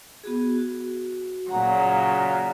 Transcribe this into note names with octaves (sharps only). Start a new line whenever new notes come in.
B3 F#4 G#4
F#4
A#2 C#3 F#3 F#5 A#5